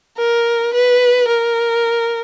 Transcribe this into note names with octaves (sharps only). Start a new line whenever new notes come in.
A#4
B4
A#4